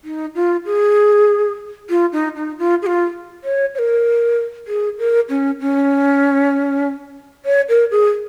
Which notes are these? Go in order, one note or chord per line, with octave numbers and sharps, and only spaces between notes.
D#4
F4
G#4
F4
D#4
D#4
F4
G#4
F4
C#5
C#5
A#4
G#4
A#4
C#4
C#4
C#5
A#4
G#4